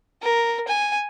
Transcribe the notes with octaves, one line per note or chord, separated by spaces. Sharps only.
A#4
G#5